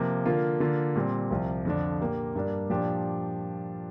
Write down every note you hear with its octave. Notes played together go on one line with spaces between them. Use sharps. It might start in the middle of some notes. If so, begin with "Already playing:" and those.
Already playing: C3 F3 A#3
D3 A#3 F4
D3 A#3 F4
A#2 G3 C4
C2 C3 F3
F2 D3 F3 D4
A#2 A#3 G4
G2 G3 A#3 D4
A#2 F3 D4 G4